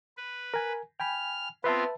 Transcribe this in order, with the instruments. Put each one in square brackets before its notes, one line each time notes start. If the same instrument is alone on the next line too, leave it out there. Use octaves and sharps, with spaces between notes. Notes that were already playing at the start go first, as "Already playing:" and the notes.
[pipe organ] B4
[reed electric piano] A#4 G#5
[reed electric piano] G5 G#5 B5 [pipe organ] F6
[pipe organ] B3 C4 F4 [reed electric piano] B4 E5 A5